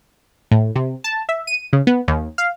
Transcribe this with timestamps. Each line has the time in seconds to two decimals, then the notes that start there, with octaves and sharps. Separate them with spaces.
0.51 A2
0.76 C3
1.04 A5
1.29 E5
1.47 D#7
1.73 C#3
1.87 B3
2.08 D#2
2.38 F5